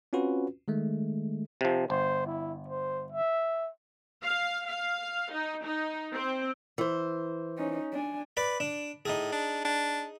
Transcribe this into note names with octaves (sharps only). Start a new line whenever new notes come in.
C4 C#4 F4 F#4 B4
D#3 G#3 A3
C3 F3
G1 C5
E4
C5
E5
F5
F5
D#4
D#4
C4
E3 C5
C#4 D#4
D4 G#5
B4 D5 B5
D4
A2 D#4 G#4
D4
D4